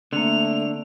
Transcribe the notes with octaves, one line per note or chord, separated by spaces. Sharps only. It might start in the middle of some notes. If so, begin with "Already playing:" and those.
D3 A3 A#3 C4 F7